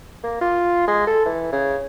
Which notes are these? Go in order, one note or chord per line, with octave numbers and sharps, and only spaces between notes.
A#3
F4
G#3
A4
E3
C#3